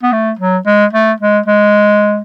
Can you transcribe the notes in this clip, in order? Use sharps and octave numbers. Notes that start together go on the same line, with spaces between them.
B3
A3
F#3
G#3
A3
G#3
G#3